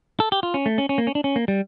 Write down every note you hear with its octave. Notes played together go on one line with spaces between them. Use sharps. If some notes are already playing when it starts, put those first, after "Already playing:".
A4
G4
F4
C#4
A3
C#4
C#4
A#3
C#4
D4
C#4
A#3
G3